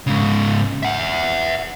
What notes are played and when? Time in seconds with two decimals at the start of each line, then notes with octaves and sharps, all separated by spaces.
0.07 G#2 C#3
0.83 E5 F#5